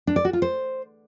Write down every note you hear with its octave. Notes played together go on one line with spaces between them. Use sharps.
D4
D5
F#4
F4
C5